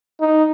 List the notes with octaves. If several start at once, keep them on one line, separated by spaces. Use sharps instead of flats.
D#4